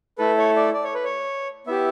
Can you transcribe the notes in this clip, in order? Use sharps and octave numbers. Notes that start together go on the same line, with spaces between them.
A3 E4 A4 B4
C#5
D5
D5
C#5
B4
C#5
B3 E4 G4 E5